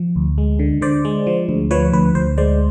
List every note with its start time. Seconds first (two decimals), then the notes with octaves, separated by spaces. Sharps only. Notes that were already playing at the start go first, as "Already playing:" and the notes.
Already playing: F3
0.16 D2
0.38 G#3
0.59 D3
0.81 D3 C5 D5
1.05 G#3
1.27 F3
1.49 D2
1.71 F3 B4 C#5
1.93 D2 B4
2.15 D2 C5
2.38 G#3 C5 D5